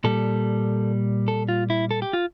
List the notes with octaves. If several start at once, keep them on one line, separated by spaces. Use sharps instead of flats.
A#2 G3 A4
A4
F4
E4
A4
G4
F4